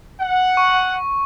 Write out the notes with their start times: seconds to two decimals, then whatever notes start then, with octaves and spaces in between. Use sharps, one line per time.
0.20 F#5
0.57 C#6